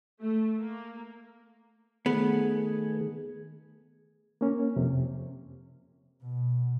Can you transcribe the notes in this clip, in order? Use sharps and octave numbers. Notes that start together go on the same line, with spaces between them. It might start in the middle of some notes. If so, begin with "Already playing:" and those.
A3
A#3
D#3 A3 B3 G#4
A#3 C#4
F2 C3
B2